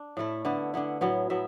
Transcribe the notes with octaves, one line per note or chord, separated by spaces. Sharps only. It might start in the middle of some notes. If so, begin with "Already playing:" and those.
Already playing: D4
A2 A3 E4
D3 B3 E4
D3 B3 E4
A2 F#3 B3 E4
A2 F#3 B3 E5